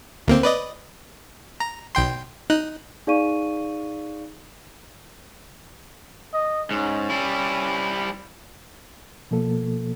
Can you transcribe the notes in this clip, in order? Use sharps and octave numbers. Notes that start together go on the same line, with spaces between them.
D2 A#3 C4
B4 D5 D#5
A#5
B1 G5 C6
D#4 F#6
D#4 G#4 D5 F5 C#6 D#7
D#5
G#2 C#4
G3 E4
B2 F3 A#3 A4